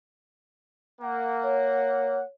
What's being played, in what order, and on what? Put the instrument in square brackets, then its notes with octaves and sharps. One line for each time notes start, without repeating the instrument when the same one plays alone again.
[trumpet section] A#3 F#5
[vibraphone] C#5